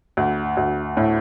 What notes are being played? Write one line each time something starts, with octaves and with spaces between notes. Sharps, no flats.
D2
D2
A2